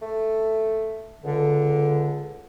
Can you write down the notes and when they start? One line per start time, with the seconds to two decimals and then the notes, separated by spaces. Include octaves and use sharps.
0.02 A3
1.24 C#2 D3